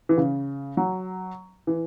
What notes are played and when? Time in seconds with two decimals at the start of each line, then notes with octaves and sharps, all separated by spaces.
0.09 E3
0.18 C#3
0.77 F#3
1.67 E3